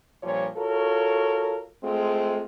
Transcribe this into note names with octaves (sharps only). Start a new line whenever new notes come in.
G2 A#2 F3 G3 C#5
F4 F#4 A4 A#4 C#5
G#3 A3 C4 F4 G#4